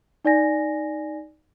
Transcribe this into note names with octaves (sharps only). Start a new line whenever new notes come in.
D#4 D5 G#5 A#6